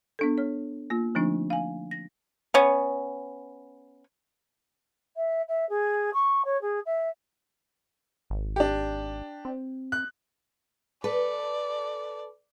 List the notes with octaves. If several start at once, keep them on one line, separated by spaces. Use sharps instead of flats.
B3 D4 A4
C#5 F6
A#3 F4
D3 F3 A3 C4 D4 D#4
F5 G#5
A#6
B3 C#4
E5
E5
G#4
C#6
C#5
G#4
E5
G#1
D4 G4
C4
F#6
A4 B4 D5